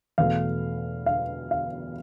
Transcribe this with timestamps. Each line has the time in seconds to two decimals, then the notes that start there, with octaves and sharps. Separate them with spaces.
0.18 E2 B2 A3 F5
1.06 F5
1.51 F5